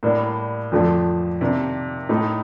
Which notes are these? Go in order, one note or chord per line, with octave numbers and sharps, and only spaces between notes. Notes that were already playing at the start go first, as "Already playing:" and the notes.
A2 G3 A#3 D4
F2 D3 F3 A3 D4
C3 D#3 A#3 D4
A2 A3 D#4